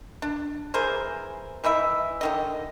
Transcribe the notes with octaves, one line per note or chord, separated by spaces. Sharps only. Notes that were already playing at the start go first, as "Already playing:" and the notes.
D4
E3 G#4 A#4 C5
E3 D#4 E4 E5
D3 D#3 D#5